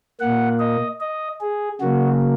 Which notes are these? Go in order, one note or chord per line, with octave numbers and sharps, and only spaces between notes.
A#2 A#3 F#5
D#5
D#5
G#4
C#3 F#3 A#3 F#4